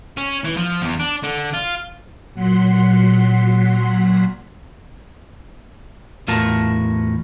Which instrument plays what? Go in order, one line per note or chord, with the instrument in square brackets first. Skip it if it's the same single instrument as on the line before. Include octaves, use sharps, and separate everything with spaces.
[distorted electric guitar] C#4
E3
F3
E2
D4
D3
F4
[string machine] A#2 F#3 F#5 C6 B6
[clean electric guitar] E2 A2 F4 F#4 A#4 A5